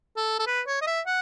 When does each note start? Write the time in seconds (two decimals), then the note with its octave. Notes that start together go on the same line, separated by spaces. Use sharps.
0.17 A4
0.39 A4
0.47 B4
0.67 C#5
0.82 D#5
0.87 E5
1.06 F#5